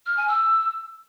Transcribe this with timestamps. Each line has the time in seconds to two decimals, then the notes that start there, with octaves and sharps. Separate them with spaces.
0.06 F6
0.17 G#5
0.28 E6